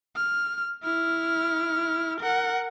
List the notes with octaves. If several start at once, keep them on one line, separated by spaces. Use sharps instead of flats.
F6
E4 F6
A#4 F#5